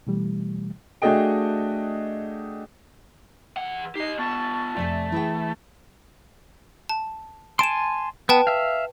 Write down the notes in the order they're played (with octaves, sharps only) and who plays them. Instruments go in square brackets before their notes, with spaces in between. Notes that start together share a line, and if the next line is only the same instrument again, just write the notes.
[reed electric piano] B2 E3 G3 A3
[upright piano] A3 D4 F#4 G#4 D#5 G5
[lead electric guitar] E3 F#5
[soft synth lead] D#4 [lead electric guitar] G4 D#5 [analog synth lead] C7
[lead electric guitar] B3 F4 [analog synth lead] A5 [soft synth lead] C#6
[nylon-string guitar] F2 C3 G#5 [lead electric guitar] A3 [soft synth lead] D5
[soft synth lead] E3 [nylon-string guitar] E4 G#4 G5
[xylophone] A5
[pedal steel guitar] G#5 A5 C6 [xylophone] D7 E7
[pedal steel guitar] B3 [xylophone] B4 G5 A5
[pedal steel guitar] E5 F5